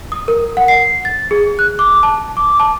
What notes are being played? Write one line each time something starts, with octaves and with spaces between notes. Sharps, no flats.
D#6
A#4
F#5
C7
A6
G#4
F#6
D6
A5
D6
A5